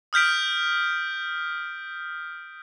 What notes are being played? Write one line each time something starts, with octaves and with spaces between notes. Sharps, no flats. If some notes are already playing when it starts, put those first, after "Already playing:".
D#6 F6 G6 B6 D7